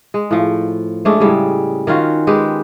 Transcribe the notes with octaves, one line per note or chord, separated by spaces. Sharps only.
G#3
A2 F3
G#3 A3 C#4 D4
A2 C#3 G3 G#3
D#3 C#4 F4 F#4
G#3 G4 B4